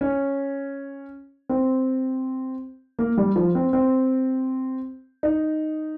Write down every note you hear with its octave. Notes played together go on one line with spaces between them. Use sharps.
C#4
C4
A#3
G3
F3
C4
C4
D#4